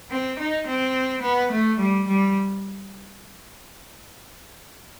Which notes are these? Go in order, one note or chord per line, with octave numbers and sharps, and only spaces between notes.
C4
D#4
C4
B3
A3
G3
G3